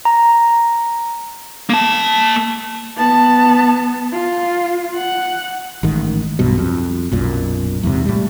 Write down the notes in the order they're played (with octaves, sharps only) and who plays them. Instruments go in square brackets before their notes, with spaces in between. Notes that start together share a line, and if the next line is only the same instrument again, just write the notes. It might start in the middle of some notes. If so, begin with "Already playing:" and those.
[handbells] A#5
[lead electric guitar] A#3 A5
[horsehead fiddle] B3 A5
F4
F#5
[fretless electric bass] A1 G#2 D#3
B1 G2 B2
F2
B1 F#2 A#2
E2 G#2 C3
A2 G3